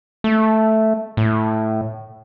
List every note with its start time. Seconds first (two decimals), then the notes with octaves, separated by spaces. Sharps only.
0.24 A3
1.17 A2